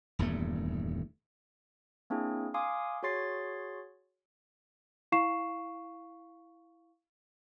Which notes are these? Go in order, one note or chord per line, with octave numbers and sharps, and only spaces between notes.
D#1 E2 G2 A3
A#3 C4 D4 E4 G#4
F5 G#5 C6 D6 D#6
F#4 G#4 C#5 C6 A6 C7
E4 F5 C#6 C7 E7